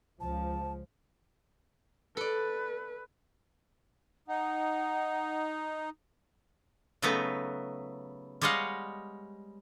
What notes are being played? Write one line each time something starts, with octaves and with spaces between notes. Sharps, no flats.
C#2 F3 A5
A4 B4 D5
D#4 F#5
C#3 F#3 A3 B3 D#4 B4
G3 G#3 C#5 D#5 F5 F#5